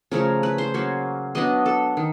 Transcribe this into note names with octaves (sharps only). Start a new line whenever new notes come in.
C#3 F3 A3 C#4 A#4
B4
C5
F#3 A#3 C#4
F#3 B3 D4 D#5
A4
D#3